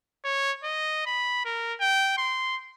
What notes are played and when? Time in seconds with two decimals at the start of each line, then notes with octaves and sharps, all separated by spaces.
0.24 C#5
0.64 D#5
1.06 B5
1.45 A#4
1.81 G5
2.18 C6